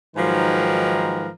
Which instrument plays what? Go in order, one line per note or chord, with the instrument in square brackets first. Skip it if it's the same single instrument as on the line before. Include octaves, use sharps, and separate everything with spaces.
[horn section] G#2 D#3 F3 F#3 A#4 B4